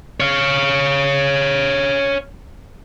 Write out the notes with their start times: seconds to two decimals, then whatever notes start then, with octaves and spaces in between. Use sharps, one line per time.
0.20 C#5 F5